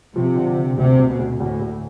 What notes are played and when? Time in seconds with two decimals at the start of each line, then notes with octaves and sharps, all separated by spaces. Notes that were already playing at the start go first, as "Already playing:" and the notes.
0.15 C3 F3
0.36 D3
0.57 D3
0.77 D2 C3
0.99 D2
1.09 B2
1.19 D2
1.40 D2 A2
1.61 D2